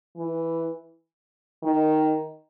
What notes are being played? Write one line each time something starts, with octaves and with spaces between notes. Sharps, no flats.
E3
D#3